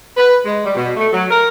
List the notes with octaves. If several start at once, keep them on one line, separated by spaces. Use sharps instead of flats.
B4
G#3
G3
B2
A3
F#3
A#4